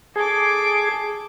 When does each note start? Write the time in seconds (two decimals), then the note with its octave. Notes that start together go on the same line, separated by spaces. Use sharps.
0.16 G#4 A4 D6